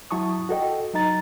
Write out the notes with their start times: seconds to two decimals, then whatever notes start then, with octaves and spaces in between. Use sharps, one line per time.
0.11 F#3 E4 A5 C#6 D#6
0.49 F#4 A4 D#5 G5
0.94 F#3 D#4 D#5 A#5 A6